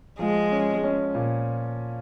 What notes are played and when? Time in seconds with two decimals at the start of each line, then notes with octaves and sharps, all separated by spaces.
0.19 F3 G#3
0.52 C#4
0.83 C#4
1.15 A#2